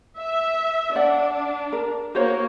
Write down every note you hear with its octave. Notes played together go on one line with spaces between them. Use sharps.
E5
D4 D5 F#5
A#4
A#3 F#4 C5 C#5